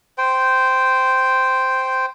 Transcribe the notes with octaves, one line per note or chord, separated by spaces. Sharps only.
C5 G5